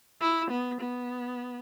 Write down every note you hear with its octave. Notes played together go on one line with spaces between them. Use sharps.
E4
B3
B3